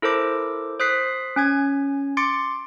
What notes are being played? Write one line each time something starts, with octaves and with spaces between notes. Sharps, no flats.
E4 A4 A#4 C5 D6
C5 D#6 F#6 B6 C7
C#4 G#5 G#6
C6 D6 A6 C#7 D7